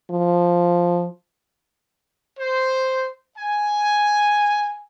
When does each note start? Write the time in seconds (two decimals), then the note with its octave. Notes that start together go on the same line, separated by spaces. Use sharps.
0.10 F3
2.38 C5
3.38 G#5